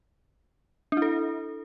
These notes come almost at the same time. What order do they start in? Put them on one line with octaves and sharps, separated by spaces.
D4 E4 A4